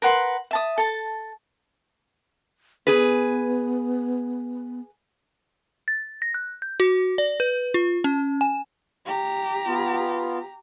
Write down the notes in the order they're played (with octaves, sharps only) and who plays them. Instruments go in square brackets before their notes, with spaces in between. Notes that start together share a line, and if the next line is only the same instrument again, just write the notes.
[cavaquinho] A#4 B4 F#5 C6
E5 A5 D#6
A4 A5
[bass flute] B3 [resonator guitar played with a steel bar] G#4 B4
[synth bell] A6
A#6
F#6
G6
F#4
D5
B4
F4
C#4
G#5
[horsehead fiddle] G4 A#5
[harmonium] B3 F4